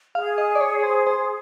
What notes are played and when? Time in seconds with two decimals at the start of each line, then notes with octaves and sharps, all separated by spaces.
0.15 G#4 F5
0.38 D#5
0.55 D5
0.61 C#5
0.83 C5
1.07 C5